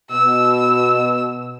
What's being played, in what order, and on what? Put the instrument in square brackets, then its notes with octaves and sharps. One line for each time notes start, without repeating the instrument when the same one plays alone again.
[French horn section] B2 [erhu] E6